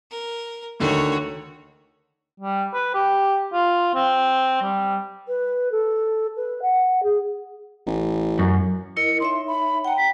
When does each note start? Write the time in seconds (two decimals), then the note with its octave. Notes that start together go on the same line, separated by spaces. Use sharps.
0.11 A#4
0.80 D2 D3 D#3 F#4 C#5
2.40 G3
2.74 B4
2.94 G4
3.53 F4
3.95 C4
4.62 G3
5.27 B4
5.71 A4
6.36 B4
6.61 F#5
7.03 G#4
7.87 A1
8.39 F#2
8.97 E4 A#4 D#5 C#7
9.20 D#4 C#5 E5 C6
9.48 B5
9.85 F#5 G5 A#5
9.98 B6